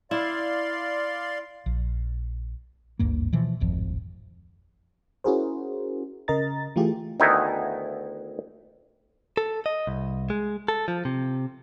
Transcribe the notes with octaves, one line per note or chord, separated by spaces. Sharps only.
E4 D5 F5 C6
A#1
G#1 D2 G2 A#3
B2 E3 F3
D1 G#1 F2 F3
C#4 E4 F#4 G#4 A#4 C5
C#3 A#4 D#5 A#5 A6
E3 A3 F4 G4 G#4
D2 D#3 B3 D#4 E4 G#5
A4
D#5
C2
G#3
A4
F3
C3